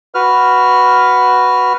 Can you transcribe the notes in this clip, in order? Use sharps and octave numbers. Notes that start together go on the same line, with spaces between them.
F#4 B4 F6